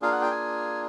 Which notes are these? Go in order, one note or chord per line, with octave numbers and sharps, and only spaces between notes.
A#3 D4 F4 G#4 F5
F#5
G5
G#5